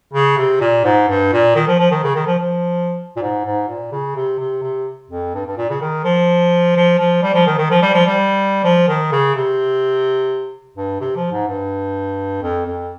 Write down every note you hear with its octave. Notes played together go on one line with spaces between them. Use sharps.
C#3
C3
A#2
G#2
G2
A#2
D#3
F3
F3
D#3
C#3
D#3
F3
F3
A#2
G#2
G#2
A#2
C#3
C3
C3
C3
F2
G2
G2
A#2
C#3
D#3
F3
F3
F3
G3
F3
D#3
D#3
F3
G3
F3
G3
F3
D#3
C#3
C3
G2
C3
F3
G#2
G2
F2
F2